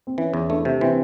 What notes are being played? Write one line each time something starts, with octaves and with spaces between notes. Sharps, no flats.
C4
E3 C#4
E2
A3 D4
C3
E3 C4